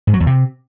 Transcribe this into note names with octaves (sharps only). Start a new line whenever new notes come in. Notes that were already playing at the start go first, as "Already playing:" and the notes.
G#2
F#3
E2
C3